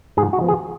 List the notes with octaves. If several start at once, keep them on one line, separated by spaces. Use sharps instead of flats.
G#2 G#4
F#4
F3 B3
G#4